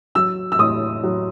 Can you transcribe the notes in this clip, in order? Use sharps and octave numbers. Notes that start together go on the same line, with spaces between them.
F#3 E6
E6
A2 D#6
F#3